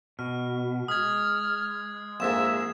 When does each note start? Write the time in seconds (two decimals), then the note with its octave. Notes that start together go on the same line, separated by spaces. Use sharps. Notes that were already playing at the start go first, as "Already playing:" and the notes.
0.19 B2 F6
0.88 G#3 D#6 F6 G#6
2.20 A#1 F2 G#2 E5 E7